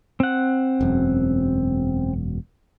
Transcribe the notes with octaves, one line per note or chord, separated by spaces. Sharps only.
C4 F#5
E1 F#2